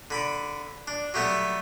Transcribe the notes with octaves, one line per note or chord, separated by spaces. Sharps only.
D3 B5 D6
D4
F#3 G3 A3 B3 E5